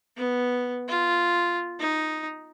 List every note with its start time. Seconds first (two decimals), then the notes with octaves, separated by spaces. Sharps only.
0.17 B3
0.88 F4
1.80 D#4